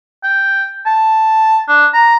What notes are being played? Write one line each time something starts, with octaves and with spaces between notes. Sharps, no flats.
G5
A5
D4
A#5